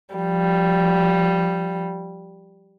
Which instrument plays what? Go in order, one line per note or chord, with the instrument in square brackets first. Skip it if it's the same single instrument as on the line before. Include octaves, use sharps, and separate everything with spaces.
[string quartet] F3 G3